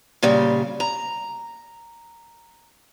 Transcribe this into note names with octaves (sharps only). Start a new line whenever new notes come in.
A#2 C#3 G3
A#5